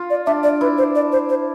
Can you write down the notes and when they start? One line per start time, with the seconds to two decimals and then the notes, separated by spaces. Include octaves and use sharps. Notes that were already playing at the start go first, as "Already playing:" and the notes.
Already playing: F4
0.10 D5
0.26 D4 E5
0.43 D5
0.61 E4 B4
0.78 C5
0.95 D5
1.12 C5
1.29 C5